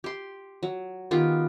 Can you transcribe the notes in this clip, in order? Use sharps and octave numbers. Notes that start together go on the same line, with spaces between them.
G4 C6
F#3
D#3 B3 F4 G4